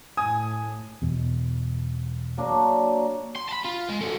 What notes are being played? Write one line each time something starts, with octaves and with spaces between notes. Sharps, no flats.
A2 G#5 D#6
E2 B2
F#3 A#3 D4
C6
A5 B5
F4
G#3
F#3 A3